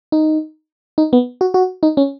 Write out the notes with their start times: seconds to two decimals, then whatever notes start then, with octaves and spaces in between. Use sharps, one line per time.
0.12 D#4
0.98 D#4
1.13 B3
1.41 F#4
1.54 F#4
1.83 D#4
1.97 C#4